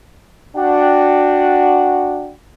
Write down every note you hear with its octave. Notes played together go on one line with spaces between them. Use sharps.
D4 F#4 F#5 G5